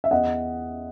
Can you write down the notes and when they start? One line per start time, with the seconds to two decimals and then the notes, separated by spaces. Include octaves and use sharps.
0.04 E5
0.11 E2 D#5 F#5